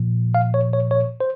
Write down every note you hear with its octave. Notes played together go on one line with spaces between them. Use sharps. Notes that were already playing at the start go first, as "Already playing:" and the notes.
Already playing: A#2 F3
F5
C#5
C#5
C#5
C5